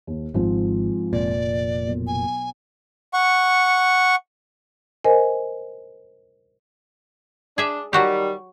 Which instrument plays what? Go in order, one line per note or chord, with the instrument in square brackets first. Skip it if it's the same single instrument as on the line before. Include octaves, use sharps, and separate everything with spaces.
[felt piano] D#2
[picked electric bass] G#1 [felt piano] G#2 F3 C4
[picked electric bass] F1 A#2 [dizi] D5
[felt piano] B1
[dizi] G#5
[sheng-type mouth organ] F#5 C#6
[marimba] A#4 C5 D#5 G#5
[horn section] D4 [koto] G#4 E5
[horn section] D#3 G3 [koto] F#3 F#4 G4